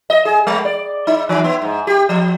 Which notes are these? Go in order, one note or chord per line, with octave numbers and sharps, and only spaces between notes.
D#5
G#4
G#3
D5
D#4
E3
B3
G#2
G4
F3